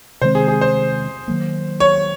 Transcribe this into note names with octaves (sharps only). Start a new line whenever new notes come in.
C3 D#3 G#3 C4 C5
G#4
G#4
C5
D#3 F#3 A#3
C#5